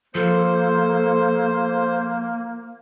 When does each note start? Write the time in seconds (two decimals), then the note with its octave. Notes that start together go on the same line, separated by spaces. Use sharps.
0.15 F3 A#3 A4 C5